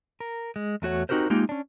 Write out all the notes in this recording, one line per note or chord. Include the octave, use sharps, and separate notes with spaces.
A#4
G#3
E2 A3 F#4 C#5 F#5
C4 D#4 F#4 G4 A#4 C5
G#3 A#3 D#4 F4 G4
C#4 D4